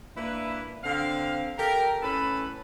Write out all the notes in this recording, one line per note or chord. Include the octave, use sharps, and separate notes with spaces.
A#3 D4 E4 B4
D3 C4 F5
G4 A4 A#4
A2 C#4 A4 B4 B5